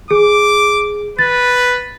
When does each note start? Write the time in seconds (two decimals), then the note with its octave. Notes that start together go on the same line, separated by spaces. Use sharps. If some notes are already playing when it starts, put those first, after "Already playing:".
0.11 G#4 D6
1.19 B4 A6